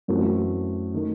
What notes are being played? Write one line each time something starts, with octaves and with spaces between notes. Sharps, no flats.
F#2 E3 A3 C4 F#4
D#3 A3